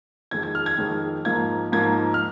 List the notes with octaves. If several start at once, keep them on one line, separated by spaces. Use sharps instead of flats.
F2 D#3 G#3 G#6
G#6
F6
G#6
F2 D#3 G#3
G#2 F3 A#3 G#6
G#2 F3 A#3 G#6
F6